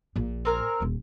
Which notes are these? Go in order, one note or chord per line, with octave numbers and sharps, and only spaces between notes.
A#1 A#2
C4 A#4 G#5
D#1 C#4